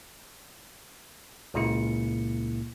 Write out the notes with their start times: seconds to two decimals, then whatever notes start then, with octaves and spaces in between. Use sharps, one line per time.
1.54 C#2 A#2 C#3 A#3 E4 C#7